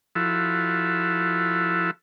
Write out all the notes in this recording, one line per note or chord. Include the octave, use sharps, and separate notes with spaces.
F3 E4 F#4 A4